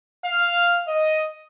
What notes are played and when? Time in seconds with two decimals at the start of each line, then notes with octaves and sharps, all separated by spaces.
0.24 F5
0.87 D#5